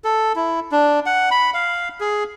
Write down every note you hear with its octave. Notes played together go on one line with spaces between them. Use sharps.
A4
E4
D4
F#5
B5
F5
G#4